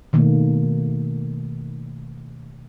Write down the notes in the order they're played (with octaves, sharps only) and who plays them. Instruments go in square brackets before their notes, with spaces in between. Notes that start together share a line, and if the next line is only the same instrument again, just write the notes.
[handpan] B2 D#3 A3 A#3